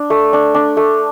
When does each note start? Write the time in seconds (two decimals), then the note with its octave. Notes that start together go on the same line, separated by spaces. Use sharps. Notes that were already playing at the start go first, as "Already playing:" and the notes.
Already playing: D4
0.10 A3
0.33 D4
0.54 D4
0.77 A3